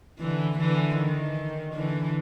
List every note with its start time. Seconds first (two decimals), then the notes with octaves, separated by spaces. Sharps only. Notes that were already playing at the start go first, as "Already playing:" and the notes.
0.19 D3 E3
0.58 D3 E3
0.96 D#3
1.74 D3 E3